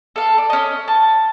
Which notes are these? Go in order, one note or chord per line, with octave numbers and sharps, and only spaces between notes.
A4 F5
D5
C#4 D#5
A5